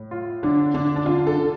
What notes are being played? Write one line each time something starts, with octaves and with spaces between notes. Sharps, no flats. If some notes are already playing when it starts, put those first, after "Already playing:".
Already playing: A2
F4
D3 D4
D3 D4
D4
D3 F4
A4
D3